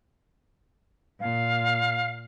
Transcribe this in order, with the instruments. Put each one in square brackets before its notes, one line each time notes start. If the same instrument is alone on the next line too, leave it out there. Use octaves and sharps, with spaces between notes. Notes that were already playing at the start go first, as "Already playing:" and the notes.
[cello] A#2 [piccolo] F5